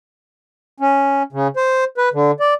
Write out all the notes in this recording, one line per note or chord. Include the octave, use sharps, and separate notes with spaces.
C#4
C#3
C5
B4
D3
D5